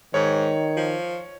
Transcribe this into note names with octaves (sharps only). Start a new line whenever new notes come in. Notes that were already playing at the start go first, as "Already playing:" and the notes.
G#2 D#3 C#5
F3